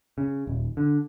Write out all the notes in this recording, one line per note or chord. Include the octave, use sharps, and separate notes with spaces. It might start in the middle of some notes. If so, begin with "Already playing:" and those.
C#3
D#1
D3